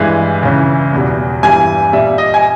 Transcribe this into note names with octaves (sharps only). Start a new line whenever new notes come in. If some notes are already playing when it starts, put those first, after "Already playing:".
Already playing: G2 E3 G#3
C#2 C#3 E3
E2 B2 G3
G2 E3 G3 G#5
A#2 G3 E5
D#5
G#5